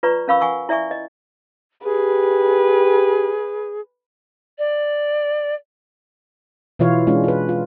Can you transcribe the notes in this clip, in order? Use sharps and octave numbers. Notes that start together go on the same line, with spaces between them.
F4 B4 D5 A#5 C#6
C#4 A#4 F5 B5 C#6 E6
F#5 G#5 C#6 E6
E4 D5 E5 G#5 C#6
D#5
G4 G#4 B4
D5
B2 E3 E4 F4 C#5 F5
G#3 C#4 D4 F4
F4 B4
F4